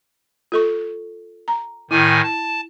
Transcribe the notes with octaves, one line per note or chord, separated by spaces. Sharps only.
F4 A4 C#6
A#5
A2 D#3 E4 G#5
A5